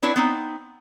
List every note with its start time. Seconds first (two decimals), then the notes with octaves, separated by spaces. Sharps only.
0.02 C4 D4 E4 B4 C#5
0.16 B3 C4 D#4